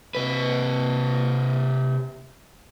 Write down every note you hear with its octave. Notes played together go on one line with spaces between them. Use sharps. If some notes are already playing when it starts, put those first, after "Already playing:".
C3 B4